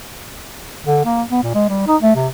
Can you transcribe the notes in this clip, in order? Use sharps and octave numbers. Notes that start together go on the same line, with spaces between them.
D3
A#3
B3
A#2
G#3
G3
D#4
A3
C3